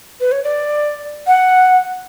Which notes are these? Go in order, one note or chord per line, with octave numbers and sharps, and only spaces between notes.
B4
C#5
D5
F#5